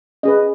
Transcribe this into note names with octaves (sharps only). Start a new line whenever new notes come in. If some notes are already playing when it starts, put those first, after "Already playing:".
C#4 G#4 B4 D#5